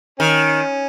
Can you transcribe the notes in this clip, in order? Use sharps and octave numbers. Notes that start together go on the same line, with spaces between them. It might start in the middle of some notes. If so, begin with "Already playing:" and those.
D#3 C#4